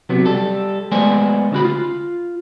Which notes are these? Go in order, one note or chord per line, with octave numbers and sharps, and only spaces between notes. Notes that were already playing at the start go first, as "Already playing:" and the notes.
C3 F#3 B3
G3 A4
G#3 A3 B3 C5 D5 G#5
D2 C#3 E3 F#4 B5
F4